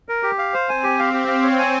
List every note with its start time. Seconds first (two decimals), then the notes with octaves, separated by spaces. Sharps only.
0.09 A#4
0.23 G4
0.38 F5
0.54 C5
0.68 C4 G#5
0.83 G4
0.99 F5
1.14 C4 G4
1.28 F5
1.43 C#5
1.59 G#5